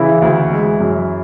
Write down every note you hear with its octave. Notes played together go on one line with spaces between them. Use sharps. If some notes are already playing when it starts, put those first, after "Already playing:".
Already playing: C#3 E3 E4
D2
G#3
F#2